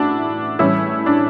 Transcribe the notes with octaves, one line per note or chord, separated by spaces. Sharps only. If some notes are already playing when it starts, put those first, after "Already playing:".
Already playing: A2 E3 D4 E4 F#4
A2 E3 G3 C#4 E4
D4